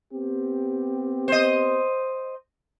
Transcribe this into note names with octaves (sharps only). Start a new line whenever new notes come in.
B3 C4 G4
C5 D#5